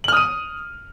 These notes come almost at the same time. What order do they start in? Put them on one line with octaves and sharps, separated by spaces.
F#7 F6 D#6 D#7